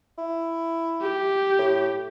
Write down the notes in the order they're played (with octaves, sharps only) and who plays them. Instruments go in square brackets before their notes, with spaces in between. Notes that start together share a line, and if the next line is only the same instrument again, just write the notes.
[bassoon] E4
[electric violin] G4
[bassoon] A2